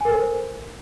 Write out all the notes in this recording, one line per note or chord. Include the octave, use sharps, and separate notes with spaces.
A4 A#4 C5 G#5